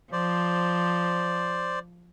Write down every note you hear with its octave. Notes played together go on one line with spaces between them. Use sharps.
F3 C5 D5